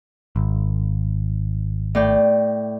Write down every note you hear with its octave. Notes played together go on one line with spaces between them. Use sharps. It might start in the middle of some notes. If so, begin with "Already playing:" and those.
G#1
A2 D5 G5